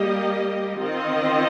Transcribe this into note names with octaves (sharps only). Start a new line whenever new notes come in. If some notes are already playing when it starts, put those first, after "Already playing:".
Already playing: G3 A#3 G4 D#5
D#3 C4 F4 D#5